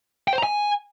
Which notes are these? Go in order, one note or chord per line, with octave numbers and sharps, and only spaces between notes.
G5
C5
A#5
G#5